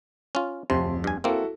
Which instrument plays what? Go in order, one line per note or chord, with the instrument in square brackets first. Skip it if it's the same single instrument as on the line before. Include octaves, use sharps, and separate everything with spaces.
[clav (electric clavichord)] C#4 F4
[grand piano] D1 F2 C6 [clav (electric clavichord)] C3
[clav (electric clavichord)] G2 G#5
[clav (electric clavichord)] A#3 C4 [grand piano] E4 F#4 A4